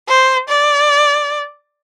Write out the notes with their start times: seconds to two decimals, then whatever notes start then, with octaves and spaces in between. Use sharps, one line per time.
0.08 C5
0.49 D5